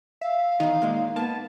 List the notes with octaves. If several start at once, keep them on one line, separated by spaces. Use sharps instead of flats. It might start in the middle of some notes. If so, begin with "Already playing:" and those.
E5 F5
E2 D#3 D#4
A#2 G#3 A#3
A#3 B3 A5